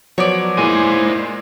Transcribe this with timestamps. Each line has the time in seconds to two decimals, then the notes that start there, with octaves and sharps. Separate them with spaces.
0.18 F3 F#3 B3 C#5 D5
0.57 A#2 G#3 E4 C5 G#5 D#7